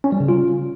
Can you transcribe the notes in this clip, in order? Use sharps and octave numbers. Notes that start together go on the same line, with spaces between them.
C#4
G3
C#3
F4